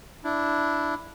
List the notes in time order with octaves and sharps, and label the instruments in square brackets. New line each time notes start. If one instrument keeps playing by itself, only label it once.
[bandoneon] D4 E4